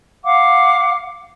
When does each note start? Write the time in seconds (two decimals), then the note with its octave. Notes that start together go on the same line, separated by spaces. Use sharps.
0.24 F5 F#5 D6